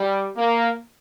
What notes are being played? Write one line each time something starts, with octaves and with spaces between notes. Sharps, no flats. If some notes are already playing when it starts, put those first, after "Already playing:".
Already playing: G3
A#3